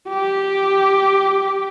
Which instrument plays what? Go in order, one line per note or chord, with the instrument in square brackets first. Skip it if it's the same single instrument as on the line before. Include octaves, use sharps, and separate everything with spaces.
[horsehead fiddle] G4